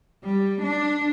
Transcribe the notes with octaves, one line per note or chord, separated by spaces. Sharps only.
G3
D4